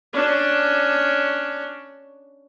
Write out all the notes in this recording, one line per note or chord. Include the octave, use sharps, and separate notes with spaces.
C#4 D4